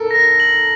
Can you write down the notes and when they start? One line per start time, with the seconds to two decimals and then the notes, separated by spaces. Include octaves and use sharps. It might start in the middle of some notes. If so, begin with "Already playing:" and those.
Already playing: A4 A#4
0.11 A#6
0.40 F#7